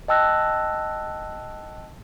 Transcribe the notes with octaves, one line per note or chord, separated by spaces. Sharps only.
D#5 G5 A5 E6 F#6 A#6